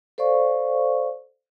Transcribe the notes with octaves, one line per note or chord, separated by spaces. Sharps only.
A4 C5 D5 F5 C#6